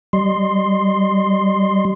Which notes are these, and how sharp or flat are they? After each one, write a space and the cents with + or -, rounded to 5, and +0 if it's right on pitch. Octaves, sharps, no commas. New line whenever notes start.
G3 -20 D#5 -30 C6 +0